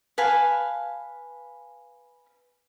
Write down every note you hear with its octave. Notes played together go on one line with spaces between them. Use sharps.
B4 F5 G#5 A5